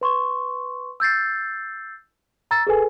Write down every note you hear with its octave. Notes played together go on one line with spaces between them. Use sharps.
B4 C6 C#6
E6 G6 A6 C7
A#5 E6 A6
G#4 A4 B4 G#5